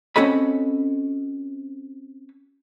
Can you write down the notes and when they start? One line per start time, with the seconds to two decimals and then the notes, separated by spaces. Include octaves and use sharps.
0.16 C4 C#4 F#4 A4 D#5 B5